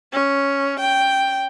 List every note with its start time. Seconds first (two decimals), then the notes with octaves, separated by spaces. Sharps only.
0.13 C#4
0.80 G5